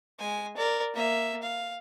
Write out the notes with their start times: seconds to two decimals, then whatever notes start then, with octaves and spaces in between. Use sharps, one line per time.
0.19 G#3 G#5
0.56 A#4 D5
0.94 A#3 E5
1.42 F5